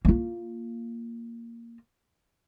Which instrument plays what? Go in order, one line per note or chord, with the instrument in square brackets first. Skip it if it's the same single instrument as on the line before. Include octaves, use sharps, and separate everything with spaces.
[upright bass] A#3 F4